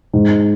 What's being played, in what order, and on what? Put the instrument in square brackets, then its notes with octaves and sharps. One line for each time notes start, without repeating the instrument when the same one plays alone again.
[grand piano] G#2